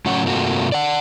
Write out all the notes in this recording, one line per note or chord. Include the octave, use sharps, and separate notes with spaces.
A2 C#3 F#3 C#4 F#5
G2 C3 A3 A#3 F4 F#4
D5 F#5